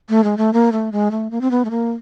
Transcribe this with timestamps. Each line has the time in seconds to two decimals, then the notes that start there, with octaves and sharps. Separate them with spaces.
0.09 A3
0.24 G#3
0.37 A3
0.53 A#3
0.72 A3
0.92 G#3
1.11 A3
1.31 A#3
1.41 C4
1.51 B3
1.65 A3
1.70 A#3